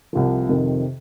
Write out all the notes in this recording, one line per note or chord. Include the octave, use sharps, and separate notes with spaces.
C2 C3 F3
F2 C3 D#3